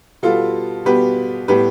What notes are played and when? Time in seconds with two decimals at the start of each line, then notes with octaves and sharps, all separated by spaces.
0.23 B2 G3 B3 F4 A4
0.85 B2 G3 B3 G4 B4
1.48 A2 G3 B3 G4 B4